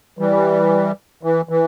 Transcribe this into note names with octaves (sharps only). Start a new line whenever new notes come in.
E3 G3
E3
E3